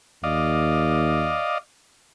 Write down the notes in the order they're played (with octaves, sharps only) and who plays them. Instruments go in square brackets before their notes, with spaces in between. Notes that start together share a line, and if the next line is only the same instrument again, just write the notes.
[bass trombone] D#2 [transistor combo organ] D5 D#5 F5